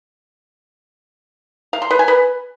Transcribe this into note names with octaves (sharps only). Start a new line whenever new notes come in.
F5
C6
B4
G#5
B4